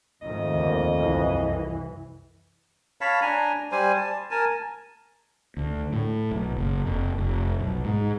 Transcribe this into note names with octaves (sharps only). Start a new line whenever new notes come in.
F2 G#2 D#3 A3 D#5
D#2 D3
C2 F#2 E3
C#5 F5 A5 B5
D4 G#5 A#5
G3 C5 G#5
A5
A#4 G#5 A5
D2
A2
B1
F#1
F1
F1
B1
G#2